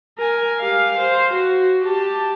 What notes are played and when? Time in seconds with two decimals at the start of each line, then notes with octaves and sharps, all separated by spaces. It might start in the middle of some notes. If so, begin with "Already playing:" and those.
0.18 A#4 G#5
0.60 G4 F5
0.97 C5
1.33 F#4
1.84 G4 A5